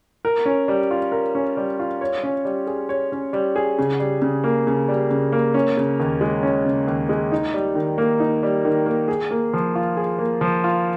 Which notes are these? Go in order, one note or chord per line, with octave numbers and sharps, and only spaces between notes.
A#4
C#4
G3
F4
A#4
C#4
G3
F4
C#5
C#4
G3
G#4
C#5
C#4
G3
G#4
C#3
G3
C#3
A#3
C#3
G3
C#3
A#3
C#4
C#3
D#2
G#3
C#4
C#3
D#2
G#3
D#4
G3
D#3
A#3
D#4
G3
D#3
A#3
G#4
A#3
F3
F4
G#4
A#3
F3
F4